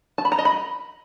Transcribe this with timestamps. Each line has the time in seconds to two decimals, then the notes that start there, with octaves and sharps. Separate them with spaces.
0.18 A5
0.25 B5
0.32 A#5
0.38 D#5
0.45 B5